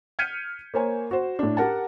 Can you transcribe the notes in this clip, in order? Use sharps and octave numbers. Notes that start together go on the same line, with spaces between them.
F6 G6 G#6 B6 C#7 D#7
A#3 A#4 C5 C#5 G#5
F#4 C5
A2 D4
G4 A#4 F#5 A5